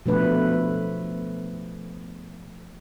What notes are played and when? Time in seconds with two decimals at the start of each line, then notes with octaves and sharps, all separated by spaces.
0.06 B2 F3 A3 D4 B4